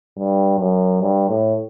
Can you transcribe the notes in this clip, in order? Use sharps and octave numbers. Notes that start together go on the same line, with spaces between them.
G2
F#2
G2
A2